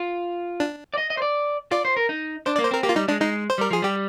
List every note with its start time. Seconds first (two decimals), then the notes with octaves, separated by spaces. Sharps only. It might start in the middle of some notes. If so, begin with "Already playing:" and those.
Already playing: F4
0.60 D4
0.94 D5
0.98 D#5
1.10 D#5
1.17 C5
1.22 D5
1.72 F4 D5
1.85 C5
1.97 A#4
2.09 D#4
2.46 D4 C5
2.56 D5
2.58 A#3
2.65 C5
2.71 C4 A#4
2.83 A#3 G4
2.89 F4
2.96 G3 D#4
3.08 G#3 D4
3.21 G#3 D#4
3.50 C5
3.58 G3 A#4
3.71 F3 G#4
3.82 G3 G4